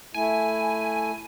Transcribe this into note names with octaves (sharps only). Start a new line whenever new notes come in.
A3 E4 G#5